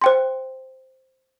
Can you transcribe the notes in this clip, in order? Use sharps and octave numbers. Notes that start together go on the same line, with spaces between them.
C5 G5 C6